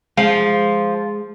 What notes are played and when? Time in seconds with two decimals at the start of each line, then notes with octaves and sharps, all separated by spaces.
0.17 F3 G#3